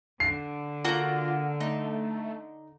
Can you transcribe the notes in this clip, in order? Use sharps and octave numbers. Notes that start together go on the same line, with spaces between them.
D3 C7
A#3 F4 F#4 A#5
A3 D#4